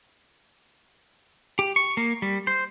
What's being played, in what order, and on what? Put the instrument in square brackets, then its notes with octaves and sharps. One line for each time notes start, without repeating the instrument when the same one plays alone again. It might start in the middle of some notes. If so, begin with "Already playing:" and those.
[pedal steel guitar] G4
C#6
A#3
G3
C5